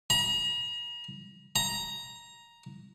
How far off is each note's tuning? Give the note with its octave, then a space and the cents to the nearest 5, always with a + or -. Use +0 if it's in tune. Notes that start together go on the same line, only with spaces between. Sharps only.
A#5 +40
A#5 +10